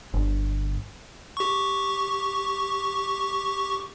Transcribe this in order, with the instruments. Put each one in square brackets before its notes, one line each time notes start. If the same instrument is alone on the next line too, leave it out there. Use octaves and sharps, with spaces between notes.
[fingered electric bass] G1
[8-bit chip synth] G4 C#6